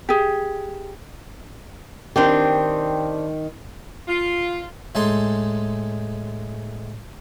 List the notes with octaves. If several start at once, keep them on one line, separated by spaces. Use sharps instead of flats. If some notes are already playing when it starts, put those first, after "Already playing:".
G4 G#4
D#3 C4 D4 G4
F4
A2 G#3 D#4 A4 G#5 C6